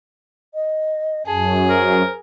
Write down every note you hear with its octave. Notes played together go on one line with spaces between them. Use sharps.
D#5
F#2 G#4 A5
A#4 C5